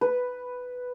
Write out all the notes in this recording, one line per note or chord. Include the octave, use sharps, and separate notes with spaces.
B4